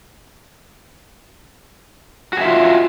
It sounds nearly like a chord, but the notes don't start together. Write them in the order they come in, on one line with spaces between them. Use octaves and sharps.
F#4 G#4 E5 F4